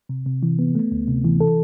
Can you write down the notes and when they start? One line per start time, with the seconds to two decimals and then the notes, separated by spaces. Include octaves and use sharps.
0.09 C3
0.26 C3
0.43 E3
0.59 B3
0.75 A3
0.92 D2
1.08 C3
1.24 E3
1.41 A4